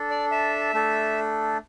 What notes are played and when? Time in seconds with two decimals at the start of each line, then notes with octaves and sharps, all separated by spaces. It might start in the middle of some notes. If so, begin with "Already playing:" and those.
Already playing: D4 A4
0.11 D5
0.31 E5
0.74 A3 D4 A4